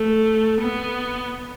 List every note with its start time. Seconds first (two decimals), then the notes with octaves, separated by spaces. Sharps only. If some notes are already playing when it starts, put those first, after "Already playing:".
Already playing: A3
0.61 B3